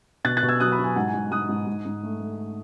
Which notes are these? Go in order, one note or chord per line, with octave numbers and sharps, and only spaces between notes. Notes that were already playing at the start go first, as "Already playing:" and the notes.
B2 F#6 A6
F#6 A6
B2
E6 G#6
F#3 D#6 F#6
B5 D#6
F#3
G#5
G#2 F#5
G#5
G#2
G#2 D#6 F#6
G#2
G#2
G#2
A3
A3